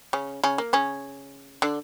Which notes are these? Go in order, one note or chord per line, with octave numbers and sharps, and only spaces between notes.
C#3 C#4
C#3 C#4
A#3
C#3 C#4
D3 D4